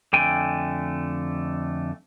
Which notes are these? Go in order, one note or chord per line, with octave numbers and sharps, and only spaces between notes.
F2 D3 A3 G5 G#5